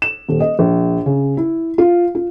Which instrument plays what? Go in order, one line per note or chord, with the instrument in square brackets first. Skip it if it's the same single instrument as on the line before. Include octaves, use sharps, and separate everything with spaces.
[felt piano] E7
D#1
D#5
A#1
C#3
E4
F4
F4